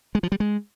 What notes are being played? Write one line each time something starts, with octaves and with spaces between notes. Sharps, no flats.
G#3
F3
G3
G#3